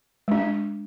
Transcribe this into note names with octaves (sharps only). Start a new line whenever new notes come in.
G#3 D4